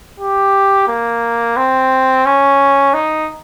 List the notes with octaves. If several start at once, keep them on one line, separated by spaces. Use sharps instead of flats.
G4
A#3
C4
C#4
D#4